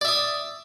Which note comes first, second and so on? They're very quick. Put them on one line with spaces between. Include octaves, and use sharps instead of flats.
D5 E5 D#6